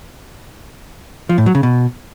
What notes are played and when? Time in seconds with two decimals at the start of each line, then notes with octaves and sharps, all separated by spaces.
1.29 F3
1.38 A2
1.46 F#3
1.55 C#3
1.63 B2